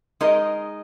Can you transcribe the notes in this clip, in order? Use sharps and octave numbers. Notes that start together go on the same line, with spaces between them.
G#3 D#4 A#4 D#5